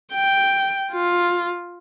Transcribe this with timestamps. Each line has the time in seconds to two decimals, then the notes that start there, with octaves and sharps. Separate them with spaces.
0.13 G5
0.92 F4